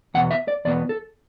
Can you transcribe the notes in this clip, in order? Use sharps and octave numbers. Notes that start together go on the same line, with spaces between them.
E2 B2 B3 F#5
E5
D5
E2 B2 B3 D5
A4